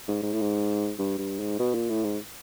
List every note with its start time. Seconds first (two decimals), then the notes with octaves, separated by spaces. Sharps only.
0.08 G#2
0.23 G#2
0.33 A2
0.41 G#2
0.99 G2
1.18 G2
1.40 G#2
1.59 B2
1.74 A#2
1.89 A2
2.04 G#2